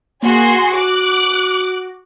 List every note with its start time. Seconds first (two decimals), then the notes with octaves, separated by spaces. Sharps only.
0.23 A#3 F#4 G#4 C6
0.74 F#4 D6 F#6